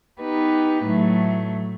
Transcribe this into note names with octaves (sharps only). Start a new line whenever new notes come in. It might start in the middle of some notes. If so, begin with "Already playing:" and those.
B3 D#4 G4 B4
A2 F#3 A3